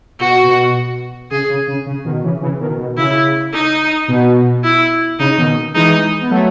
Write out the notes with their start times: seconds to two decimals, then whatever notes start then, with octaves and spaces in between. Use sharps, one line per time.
0.20 B2 F#4
0.44 B2
1.31 C#3 G#4
1.49 C#3
1.68 C#3
1.86 C#3
2.05 B2 D#3
2.23 C#3 E3
2.41 C#3 E3
2.60 B2 D#3
2.79 B2
2.97 C#3 E4
3.53 D#4
4.08 B2
4.64 E4
5.19 C#3 D#4
5.38 B2 D#3
5.75 E3 G#3 D#4
6.21 B3
6.30 F#3 A3